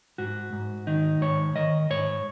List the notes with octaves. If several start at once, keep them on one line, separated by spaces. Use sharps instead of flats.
G#2 F#4
G#2
D#3 D#4
G#2 C#5
D#3 D#5
G#2 C#5